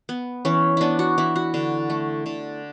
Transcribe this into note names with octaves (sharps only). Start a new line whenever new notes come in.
B3
E3 C#4
B3 D4 E4
F#4
E3 E4
F#4
D3
A3
D3